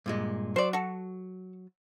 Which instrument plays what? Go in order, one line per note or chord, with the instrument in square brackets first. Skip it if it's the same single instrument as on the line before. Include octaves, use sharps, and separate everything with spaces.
[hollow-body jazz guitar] G2 A#2 G#3
[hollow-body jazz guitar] F#3 [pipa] C5 D5
[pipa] F#4 A4